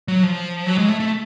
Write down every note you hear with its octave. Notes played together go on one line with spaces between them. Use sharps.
F#3
F3
F#3
G#3
A3
A3